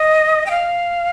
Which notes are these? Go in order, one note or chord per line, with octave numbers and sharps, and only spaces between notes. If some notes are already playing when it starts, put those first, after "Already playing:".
Already playing: D#5
G5
F5